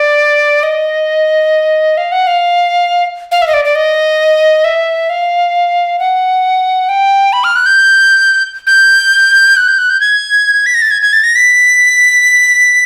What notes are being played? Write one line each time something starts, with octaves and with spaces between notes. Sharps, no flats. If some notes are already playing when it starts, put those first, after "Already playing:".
Already playing: D5
D#5
F5
F#5
F5
F5
E5
D#5
D5
D5
D#5
E5
F5
F#5
G5
B5
F6
F#6
G6
G6
F#6
G6
F#6
G6
G#6
B6
A#6
A6
G#6
G#6
A6
A#6
B6